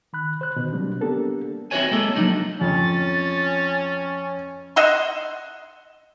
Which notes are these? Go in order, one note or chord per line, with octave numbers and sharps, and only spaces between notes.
D#3 B5 F#6
C5 F#6
B2 D3 D#3
F#3 G3 A#3 C4 D4
A#3 B3 D4 G4 A4 A#4
C4 E4 F#4 B4 C#5 G#5
G#3 A#3 A4
F3 F#3 D4 D#4
F2 C#4 A6
D#5 E5 F#5 C6